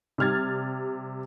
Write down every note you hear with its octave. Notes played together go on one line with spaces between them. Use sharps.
C3 G3 F6 G#6 A6